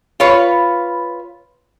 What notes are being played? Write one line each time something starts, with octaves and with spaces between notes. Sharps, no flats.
F4 B4 C#5